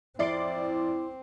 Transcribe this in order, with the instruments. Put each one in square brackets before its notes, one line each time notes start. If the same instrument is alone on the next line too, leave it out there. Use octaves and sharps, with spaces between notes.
[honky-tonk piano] F2 D5 C7 [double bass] C4 [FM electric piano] E4 C6 D6